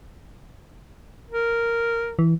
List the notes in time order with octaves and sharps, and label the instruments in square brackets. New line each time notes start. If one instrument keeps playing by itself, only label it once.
[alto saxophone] A#4
[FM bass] E3